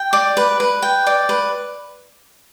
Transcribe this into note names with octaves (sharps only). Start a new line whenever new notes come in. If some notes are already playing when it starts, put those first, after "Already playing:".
Already playing: G5
D5
B4
B4
G5
D5
B4